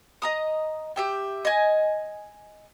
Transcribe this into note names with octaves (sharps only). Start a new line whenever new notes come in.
D#5 A#5 D#6
G4 E5 G5
D#5 G#5